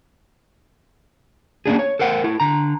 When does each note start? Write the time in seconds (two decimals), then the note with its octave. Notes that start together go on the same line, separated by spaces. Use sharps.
1.66 A#3 C#4 D4 G#4
1.79 C#5
1.99 A4 A#4 C5 F#5
2.24 E4 A4
2.40 D3 A#5